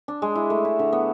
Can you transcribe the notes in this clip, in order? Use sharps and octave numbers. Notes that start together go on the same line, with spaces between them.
D4
G#3
E4
A3
E4
D3
B3